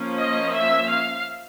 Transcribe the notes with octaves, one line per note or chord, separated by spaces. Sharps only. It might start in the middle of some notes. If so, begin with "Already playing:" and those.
Already playing: F3 A#3 C#4
D#5
E5
F5